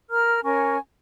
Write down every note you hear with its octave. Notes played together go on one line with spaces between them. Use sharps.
A#4 A#5 F6
C#4 A#4 G#5 C#6